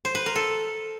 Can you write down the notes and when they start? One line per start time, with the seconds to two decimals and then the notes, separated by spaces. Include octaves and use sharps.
0.05 C5
0.15 B4
0.26 A#4
0.36 A4